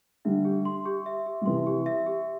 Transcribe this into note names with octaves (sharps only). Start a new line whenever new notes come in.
D3 G3 E5
G4
C6
G4
E5
G4
G3
C3 E3 C6
G4
E5
G4